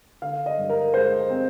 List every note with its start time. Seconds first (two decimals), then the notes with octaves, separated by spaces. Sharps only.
0.22 D3 F5
0.46 D#5
0.58 G2
0.70 A#4
0.94 G#3 C5
1.30 C4